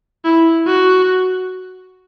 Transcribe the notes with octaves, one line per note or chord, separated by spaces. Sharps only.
E4
F#4